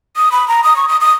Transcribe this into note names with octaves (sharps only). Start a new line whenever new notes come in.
D#6
B5
A#5
D#6
C#6
D#6
D#6